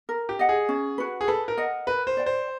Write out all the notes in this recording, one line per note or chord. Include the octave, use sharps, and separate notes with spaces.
A#4
G4
D#5 F#5
G#4
C#4
F#4 B4
G#4
A4 B4
A#4
D#5 F#5
A#4 B4
C5
D5 G5
C5